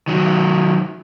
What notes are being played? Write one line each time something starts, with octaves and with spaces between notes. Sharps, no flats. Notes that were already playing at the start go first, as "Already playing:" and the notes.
D#3 F#3